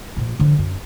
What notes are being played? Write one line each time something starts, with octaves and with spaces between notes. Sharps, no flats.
A#2 F3
D3 F3
F#2